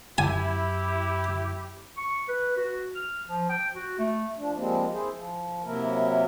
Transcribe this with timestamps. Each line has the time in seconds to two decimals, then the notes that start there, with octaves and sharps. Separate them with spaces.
0.18 F#2 E4 G4 G#5
1.97 C#6
2.28 B4
2.57 F#4
2.95 F6
3.28 F3
3.50 G5
3.74 F#4
3.99 A3
4.36 F3 D4
4.56 F3 G3 G#3 A#3 C4
4.92 E4 G#4 C5
5.13 F3
5.64 C3 F#3 A#3 E4 A#4